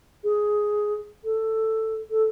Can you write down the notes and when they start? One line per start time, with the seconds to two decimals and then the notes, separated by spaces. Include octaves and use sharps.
0.24 G#4
1.24 A4
2.10 A4